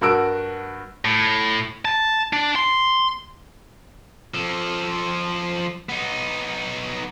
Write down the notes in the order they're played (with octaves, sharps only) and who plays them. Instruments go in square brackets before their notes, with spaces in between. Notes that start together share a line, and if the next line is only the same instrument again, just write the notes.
[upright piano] G2 F#4 A#4 A5 E6 D7
[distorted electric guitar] A2
A5
D4
C6
F3 A4
B3 D#4